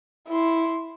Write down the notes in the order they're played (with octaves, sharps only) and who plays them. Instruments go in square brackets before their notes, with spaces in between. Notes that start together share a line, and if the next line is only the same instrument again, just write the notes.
[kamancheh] E4 C6